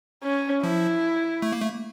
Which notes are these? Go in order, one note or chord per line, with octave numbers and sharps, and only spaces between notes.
C#4
F3 E4
A3
A#3
A3